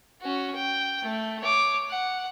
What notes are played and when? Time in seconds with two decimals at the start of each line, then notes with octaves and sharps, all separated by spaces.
0.21 C#4 F#4
0.55 G5
1.03 A3
1.41 C#5 D6
1.90 F#5